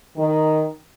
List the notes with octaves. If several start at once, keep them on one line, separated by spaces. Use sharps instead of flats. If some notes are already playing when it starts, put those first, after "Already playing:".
D#3